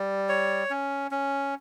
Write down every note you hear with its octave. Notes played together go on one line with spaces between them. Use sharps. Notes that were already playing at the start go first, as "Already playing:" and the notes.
Already playing: G3
C#5
C#4
C#4